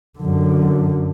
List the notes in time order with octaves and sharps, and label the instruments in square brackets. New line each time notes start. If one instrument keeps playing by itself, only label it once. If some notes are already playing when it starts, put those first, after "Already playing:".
[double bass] F#2 D3